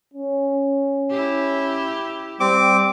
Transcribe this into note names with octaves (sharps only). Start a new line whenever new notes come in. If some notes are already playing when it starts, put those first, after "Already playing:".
C#4
E4 G4
G3 C4 D6